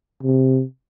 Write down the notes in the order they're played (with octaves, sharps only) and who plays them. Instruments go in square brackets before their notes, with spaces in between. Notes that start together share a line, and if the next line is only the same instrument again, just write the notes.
[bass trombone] C3